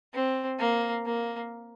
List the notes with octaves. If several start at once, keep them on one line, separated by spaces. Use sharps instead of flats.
C4
A#3
A#3